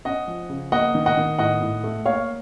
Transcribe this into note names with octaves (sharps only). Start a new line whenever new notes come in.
C#4 D#5 F#5
F3
C#3
A#3 D#5 F#5
D#3
D#5 F#5
D#3
A2 D#5 F#5
A2
A3
A#3 C#5 F5